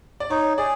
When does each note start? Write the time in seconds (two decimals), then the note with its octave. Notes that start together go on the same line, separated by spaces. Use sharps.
0.20 D5
0.30 D#4 C#5
0.58 G#4 D5